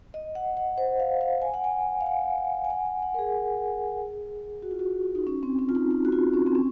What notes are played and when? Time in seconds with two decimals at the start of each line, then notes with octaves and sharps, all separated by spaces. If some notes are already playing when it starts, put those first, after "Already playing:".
0.14 D#5
0.35 F#5
0.57 F#5
0.78 C5
1.00 F5
1.21 F5
1.42 G#5
1.54 F#5
1.64 G#5
2.01 F5
2.06 F#5
2.64 G#5
2.70 F#5
2.86 G#5
3.03 F#5
3.14 A#4
3.19 G#4
4.62 F#4
4.71 F4
4.79 F#4
5.15 D#4
5.27 C#4
5.43 C4
5.59 C#4
5.69 F4
5.75 D#4
5.91 D#4
6.05 F#4
6.12 F4
6.33 C#4
6.46 C4
6.55 C#4